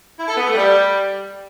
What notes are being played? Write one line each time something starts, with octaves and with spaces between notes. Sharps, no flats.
E4
A4
B3
A3
G3